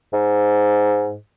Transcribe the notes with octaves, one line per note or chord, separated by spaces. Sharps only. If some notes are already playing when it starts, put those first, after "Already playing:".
G#2